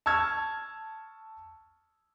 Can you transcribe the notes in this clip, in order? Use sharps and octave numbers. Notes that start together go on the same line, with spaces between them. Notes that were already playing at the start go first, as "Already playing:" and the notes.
A5 C#6 E6 F6 G#6